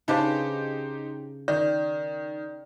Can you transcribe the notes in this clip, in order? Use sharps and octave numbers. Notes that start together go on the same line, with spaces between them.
C#3 D4 D#4 G4 B4 C5
D#3 D5